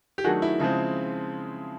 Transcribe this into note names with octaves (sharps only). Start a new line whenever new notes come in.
G4
D#3 F#3 A3 D4 F#4 G#4
E4
C#3 F3 G#3 C4 E4